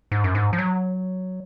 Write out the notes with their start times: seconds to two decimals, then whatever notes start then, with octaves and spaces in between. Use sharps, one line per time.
0.12 G#2
0.24 F#2
0.35 G#2
0.53 F3
0.58 F#3